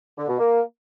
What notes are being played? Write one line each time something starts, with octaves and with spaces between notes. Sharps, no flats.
D3
B2
A#3